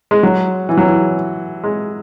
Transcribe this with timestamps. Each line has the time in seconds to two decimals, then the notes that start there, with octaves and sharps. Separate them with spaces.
0.11 G#3
0.23 F#3
0.69 E3
0.77 F#3
0.85 E3
1.64 G#3